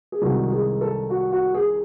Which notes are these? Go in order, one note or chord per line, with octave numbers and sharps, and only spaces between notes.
G#4
C2 C3 D#3 G#3 F#4
G#4
A4
F#4
F#4
G#4